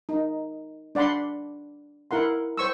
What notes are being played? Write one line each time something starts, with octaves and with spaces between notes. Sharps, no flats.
D#4
D4 D5 F#5 B5 C6
E4 A#4 F#5 C6
C5 C#6 E6